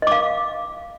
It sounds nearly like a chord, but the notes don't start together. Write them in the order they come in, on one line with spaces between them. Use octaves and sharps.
D#5 D6 F5